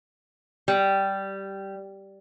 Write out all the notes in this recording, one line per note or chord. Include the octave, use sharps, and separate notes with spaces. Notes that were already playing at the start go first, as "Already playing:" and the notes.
G3